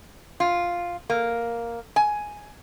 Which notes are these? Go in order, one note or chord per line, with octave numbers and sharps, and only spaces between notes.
F4
A#3
G#5